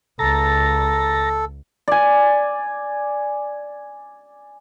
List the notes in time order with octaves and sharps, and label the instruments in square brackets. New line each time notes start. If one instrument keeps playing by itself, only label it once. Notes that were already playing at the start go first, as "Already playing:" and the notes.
[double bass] C#2 [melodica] A4 [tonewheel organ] A#5 A6 A#6
[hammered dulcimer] D5 G#5